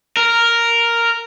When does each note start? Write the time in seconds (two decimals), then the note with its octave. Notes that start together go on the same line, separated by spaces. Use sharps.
0.17 A#4